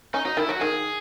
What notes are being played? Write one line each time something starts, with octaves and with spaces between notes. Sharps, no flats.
C#4 D#4
F#3 D#4
D#3 E4
F#3 F#4
D#3 G#4